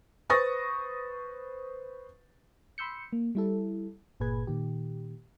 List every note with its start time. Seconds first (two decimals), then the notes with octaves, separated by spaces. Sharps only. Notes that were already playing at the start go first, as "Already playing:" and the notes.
0.30 B4 C5 C#6 D#6 A6 A#6
2.78 B5 C6 E6 G6 C#7
3.13 A#3
3.35 G3 E4 A4
4.20 G1 A#2 G#4 B4 G#6
4.47 A#2 D#3 G4